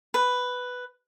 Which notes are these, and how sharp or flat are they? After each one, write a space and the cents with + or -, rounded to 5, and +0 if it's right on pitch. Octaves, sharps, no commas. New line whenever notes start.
B4 +5